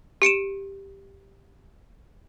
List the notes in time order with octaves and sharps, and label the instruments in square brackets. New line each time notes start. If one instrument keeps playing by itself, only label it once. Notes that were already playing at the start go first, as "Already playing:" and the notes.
[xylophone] G4 C#7 D7 E7